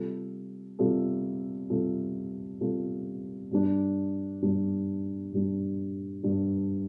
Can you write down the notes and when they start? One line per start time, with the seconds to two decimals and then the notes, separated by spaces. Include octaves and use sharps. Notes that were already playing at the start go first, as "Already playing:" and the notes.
Already playing: C3 G3 F4 A4
0.79 C3 G3 F4 A4
1.70 C3 G3 F4 A4
2.61 C3 G3 F4 A4
3.51 G2 G3 D4
4.42 G2 G3 D4
5.32 G2 G3 D4
6.23 G2 G3 D4